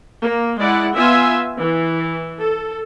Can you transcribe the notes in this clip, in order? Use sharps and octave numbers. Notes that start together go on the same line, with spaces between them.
A#3
G#3 E4 D5 F#5
B3 F4 E5 G#5
E3
A4